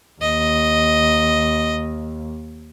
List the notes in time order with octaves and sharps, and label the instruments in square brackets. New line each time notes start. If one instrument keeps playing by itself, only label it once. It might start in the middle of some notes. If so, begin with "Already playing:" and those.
[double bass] D#2 [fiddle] D#5